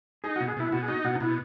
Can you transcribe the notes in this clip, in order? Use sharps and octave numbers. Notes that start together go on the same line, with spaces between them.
D#4 G#4
F#4
B2
G#4
B2 E4
E4
B2 F#4
G#4
D#4 F#4
B2 F#4
D#4
B2 E4